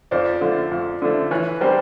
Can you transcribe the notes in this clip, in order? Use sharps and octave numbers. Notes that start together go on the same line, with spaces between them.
F2 C5 D5
D3 F3 A3
F2
D3 F3 A3
E3 B4 C#5
G3 C4 A#4 C5